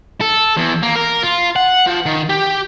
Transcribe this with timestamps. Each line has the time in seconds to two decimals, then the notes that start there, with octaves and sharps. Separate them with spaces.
0.21 A4
0.57 E2
0.83 A#3
0.96 A#4
1.23 F4
1.56 F#5
1.87 F3
2.06 D#3
2.30 G4